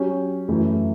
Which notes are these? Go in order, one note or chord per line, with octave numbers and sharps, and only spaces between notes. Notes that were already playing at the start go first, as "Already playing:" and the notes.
Already playing: F#3 C#4 G4
F#2 E3 A3 E4